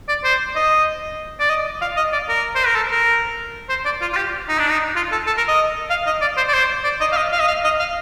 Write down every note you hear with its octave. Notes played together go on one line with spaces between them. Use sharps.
D5
C5
D#5
D5
D#5
F5
D#5
D5
A#4
C5
A#4
A4
A#4
C5
D5
F4
F4
G4
D#4
D4
D#4
F4
A4
A4
A#4
D#5
F5
D#5
D5
C5
D5
C5
D5
D#5
F5
D#5
F5
D#5
F5
D#5
F5